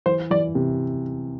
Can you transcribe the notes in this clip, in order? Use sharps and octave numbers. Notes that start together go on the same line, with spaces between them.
E3 C5
E3 D5
C3